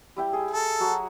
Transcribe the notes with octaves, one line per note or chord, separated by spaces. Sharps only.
G3 E4 G5
G#4
A4
F#3 F#4 A#5